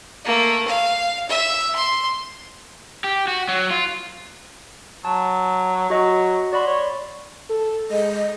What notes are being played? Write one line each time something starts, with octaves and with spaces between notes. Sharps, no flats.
A3 A#3
F5
E5
C6
G4
F#4
F#3
F4
F#3 A5
F#3 F#4 D#5 C#6
F#4 D5 B5 C6
C#5
A4
G#3 D#5